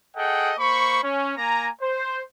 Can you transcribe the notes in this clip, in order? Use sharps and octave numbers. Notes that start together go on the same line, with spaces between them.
G#4 A4 D#5 F#5 G5
A#3 C5 B5 C#6
C#4
A#3 G#5 A#5
C5